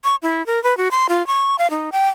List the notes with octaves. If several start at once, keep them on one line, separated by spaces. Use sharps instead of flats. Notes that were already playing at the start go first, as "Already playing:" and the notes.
C#6
E4
A#4
B4
F#4
C6
F4
C#6
F5
D#4
G5